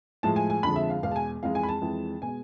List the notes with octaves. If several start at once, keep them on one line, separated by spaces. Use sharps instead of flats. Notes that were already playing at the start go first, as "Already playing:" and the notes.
A2 F3 G#3 A5
G#5
G#5
F2 D3 F3 G#3 B5
E5
F5
E2 B2 G#3 F5
A5
G#5
F2 E3 G#3 F5
G#5
B5
A5
F2 E3 G#3
B2 G#3 G#5